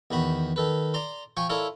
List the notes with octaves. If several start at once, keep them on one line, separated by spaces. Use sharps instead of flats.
E2 D#3 F#4 B5
D#3 A4 B4
D5 A#5 C6
F3 G5 G#5 C#6
E4 F4 A4 A#4 C#5 D5